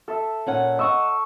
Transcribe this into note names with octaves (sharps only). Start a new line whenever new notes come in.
A4 E5
A#2 C#4 F#5
D#5 E5 F#5 C#6 E6